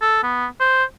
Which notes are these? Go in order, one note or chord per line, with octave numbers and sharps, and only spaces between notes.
A4
B3
C5